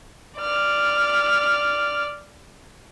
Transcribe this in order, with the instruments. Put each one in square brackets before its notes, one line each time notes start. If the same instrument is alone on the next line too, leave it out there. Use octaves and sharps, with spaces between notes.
[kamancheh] D5 F6